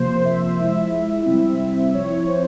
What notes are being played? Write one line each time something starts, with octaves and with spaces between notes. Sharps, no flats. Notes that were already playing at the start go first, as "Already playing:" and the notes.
Already playing: C3 F3 A#3 C5
E5
F3 G#3 E4 E5
C3 G3 C4 E4
F3 C4 E4 C#5
C5